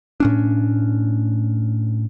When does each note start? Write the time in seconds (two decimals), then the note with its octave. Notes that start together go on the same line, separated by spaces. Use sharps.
0.20 A2 C#4 D4